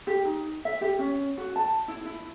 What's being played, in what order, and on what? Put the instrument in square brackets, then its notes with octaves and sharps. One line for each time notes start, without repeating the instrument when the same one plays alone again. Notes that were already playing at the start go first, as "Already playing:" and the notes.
[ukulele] G4
D#4
E5
G4
C#4
F#4
A5
E4
E4